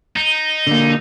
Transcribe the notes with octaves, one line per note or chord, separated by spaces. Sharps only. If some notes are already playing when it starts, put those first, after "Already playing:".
D#4
D3 A#3